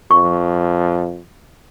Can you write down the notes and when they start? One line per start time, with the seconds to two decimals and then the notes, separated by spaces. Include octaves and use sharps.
0.11 F2 C#6